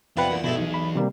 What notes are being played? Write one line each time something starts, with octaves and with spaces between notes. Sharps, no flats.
B1 F2 C3 G3 F4 B4 F#5
E2 A#2
G2 B2 G#3 A3 E4
B1 E3 G#4
B5
C3 G3 A#3